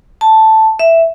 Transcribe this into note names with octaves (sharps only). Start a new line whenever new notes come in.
A5
E5